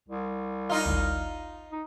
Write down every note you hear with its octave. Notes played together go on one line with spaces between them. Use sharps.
C2
D#4 F4
G#1 D2
D#4